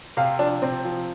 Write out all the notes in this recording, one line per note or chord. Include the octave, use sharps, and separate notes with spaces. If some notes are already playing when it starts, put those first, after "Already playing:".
C3 F5
F3 D4
C3 C4
F3